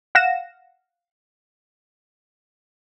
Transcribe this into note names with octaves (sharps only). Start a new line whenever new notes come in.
F5 F#5 A#6 E7